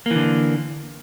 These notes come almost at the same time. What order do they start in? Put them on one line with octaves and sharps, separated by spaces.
A#3 E3 D3